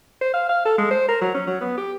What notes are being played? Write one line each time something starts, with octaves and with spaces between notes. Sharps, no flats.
C5
F5
F5
A4
G#3
C5
A#4
F#3
C#4
F#3
B3
G4